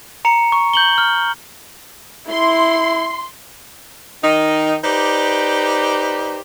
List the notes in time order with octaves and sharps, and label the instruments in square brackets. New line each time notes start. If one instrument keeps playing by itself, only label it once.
[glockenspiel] A#5 C#7 F7
C#6
G6 F#7 G7
F6
[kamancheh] E4 [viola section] C6
[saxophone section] D#3 D#4
D#4 G4 B4 C5 D5